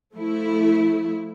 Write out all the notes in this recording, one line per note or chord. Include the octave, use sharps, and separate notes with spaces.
F3 A3 E4